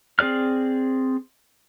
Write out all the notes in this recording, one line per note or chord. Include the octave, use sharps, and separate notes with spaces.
C4 G#4 D5 F6